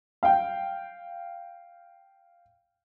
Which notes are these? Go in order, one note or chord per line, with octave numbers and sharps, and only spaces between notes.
F5 G5